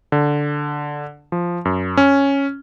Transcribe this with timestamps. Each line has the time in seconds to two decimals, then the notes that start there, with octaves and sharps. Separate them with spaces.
0.12 D3
1.32 F3
1.65 F#2
1.97 C#4